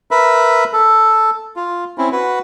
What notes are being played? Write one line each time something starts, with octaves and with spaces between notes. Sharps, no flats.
A#4 B4 E5 B5
A4
F4
C4 C#4 E4
F#4 B4